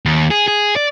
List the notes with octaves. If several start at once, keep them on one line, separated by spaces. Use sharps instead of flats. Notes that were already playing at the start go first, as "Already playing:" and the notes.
D#2
G#4
G#4
D5